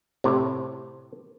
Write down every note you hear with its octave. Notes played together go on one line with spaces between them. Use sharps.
A2 C3